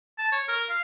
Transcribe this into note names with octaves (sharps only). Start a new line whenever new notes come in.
A5
C#5
A#4
F5